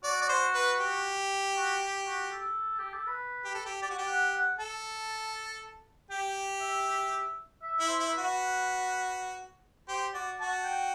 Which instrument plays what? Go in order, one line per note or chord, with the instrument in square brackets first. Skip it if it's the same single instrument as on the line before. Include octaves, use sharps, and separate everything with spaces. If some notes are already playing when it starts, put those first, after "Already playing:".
[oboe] F#4 [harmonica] D5
[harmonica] D5
C5
B4
G4
[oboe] F#4
F#4
A4
G4
A4
B4
[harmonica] G4
A4
G4
[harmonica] G4 [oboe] D5
[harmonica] F#4
G4
[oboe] F#5
F#5
[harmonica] A4 [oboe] A5
[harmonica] G4 [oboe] G5
[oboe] E5
E5
[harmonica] E4
[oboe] C5
[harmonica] E4
[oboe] B4
[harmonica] F#4
[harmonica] G4 [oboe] C5
[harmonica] F#4 [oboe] D5
[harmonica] F#4 [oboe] A5
[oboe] G5